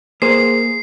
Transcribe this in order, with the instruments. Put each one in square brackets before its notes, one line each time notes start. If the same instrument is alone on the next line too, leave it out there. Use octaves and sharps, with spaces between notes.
[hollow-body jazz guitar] A#3 G#4 C5 [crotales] C7